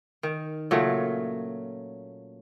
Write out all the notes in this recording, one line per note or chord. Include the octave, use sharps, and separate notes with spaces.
D#3
A#2 C#3 F#3 A3